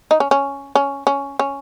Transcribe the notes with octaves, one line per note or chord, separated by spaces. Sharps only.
D#4
C#4
C#4
C#4
C#4
C#4